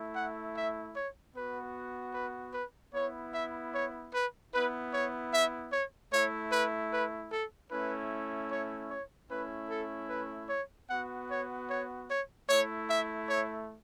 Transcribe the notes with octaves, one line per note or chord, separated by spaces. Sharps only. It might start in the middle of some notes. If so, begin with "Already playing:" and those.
Already playing: A3 E4
F#5
E5
C#5
B3 F#4 B4
B4
B4
B3 E4 C#5
E5
C#5
B4
B3 E4 B4
C#5
E5
C#5
A3 E4 C#5
B4
B4
A4
A3 C#4 E4 B4
C#5
C#5
A3 C#4 E4 B4
A4
B4
C#5
B3 F#4 F#5
C#5
C#5
C#5
A3 E4 C#5
E5
C#5